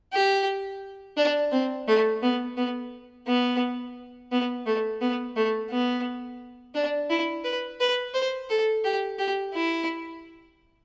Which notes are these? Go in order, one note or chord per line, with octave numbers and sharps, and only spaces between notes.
G4
D4
C4
A3
B3
B3
B3
B3
A3
B3
A3
B3
D4
E4
B4
B4
C5
A4
G4
G4
E4